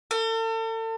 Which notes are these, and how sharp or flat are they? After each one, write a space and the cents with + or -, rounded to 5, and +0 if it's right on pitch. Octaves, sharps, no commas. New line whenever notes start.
A4 +40